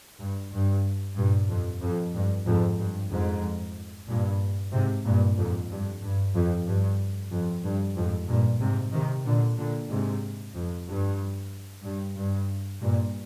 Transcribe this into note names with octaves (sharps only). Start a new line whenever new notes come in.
G2
G2
G2 A#2
F2
F2
G2
F2 G#2
G2
F2 G#2
G2 A#2
G#2 C3
G2 A#2
F2 G#2
G2
G2
F2
G2
F2
G2
F2 G#2
G2 A#2
G#2 C3
C3 D#3
A#2 D3
A#2 D3
G#2 C3
F2
G2
G2
G2
G2 A#2